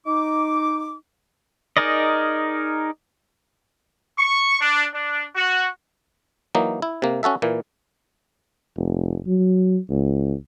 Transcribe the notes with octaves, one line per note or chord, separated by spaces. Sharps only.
D#4 D6
D#4 G#4 A#4 D5 D#5
C#6
D4
D4
F#4
E3 F#3 A#3 D#4
E4
C3 A#3
C#4 F#4 A4 E5
A#2 E3 A#3
F1
F#3
C#2